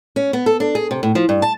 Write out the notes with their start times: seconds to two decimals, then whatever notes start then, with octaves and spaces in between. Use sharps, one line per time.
0.16 C#4
0.33 B3
0.46 A4
0.60 D4
0.75 G#4
0.91 C3
1.03 A2
1.15 F3
1.29 G2
1.42 A5